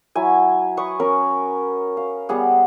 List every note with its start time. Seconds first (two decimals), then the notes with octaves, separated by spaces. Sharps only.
0.15 F#3 E4 G#5
0.77 B4 C#6 D#6
1.00 C#4 A#4 B4
1.97 F5
2.29 G3 B3 G#4 F#5